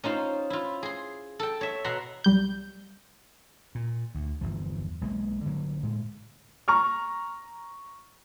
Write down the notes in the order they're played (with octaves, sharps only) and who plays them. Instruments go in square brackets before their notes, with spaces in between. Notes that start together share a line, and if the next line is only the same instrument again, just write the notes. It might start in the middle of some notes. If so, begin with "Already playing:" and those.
[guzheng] C#4 D#4 F4 C5
E4 F4
G#4 C6
A4 G5
C#5 E5
B2 E5 F#5 A#5 C6
[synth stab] B1 G3 G6
[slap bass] A#2
D2
G1 E2 F3
B1 G#3 A#3
D3 F#3 G3 A#3
A2 G#3
[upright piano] A#5 C#6 F6